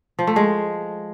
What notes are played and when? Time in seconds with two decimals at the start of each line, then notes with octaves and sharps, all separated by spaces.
0.19 F3
0.27 A3
0.36 G#3